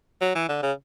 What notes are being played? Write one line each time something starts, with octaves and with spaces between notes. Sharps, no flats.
F#3
E3
D3
C#3